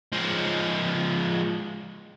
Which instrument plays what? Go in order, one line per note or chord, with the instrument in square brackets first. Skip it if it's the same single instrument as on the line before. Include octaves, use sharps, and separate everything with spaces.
[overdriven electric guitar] F3 G#3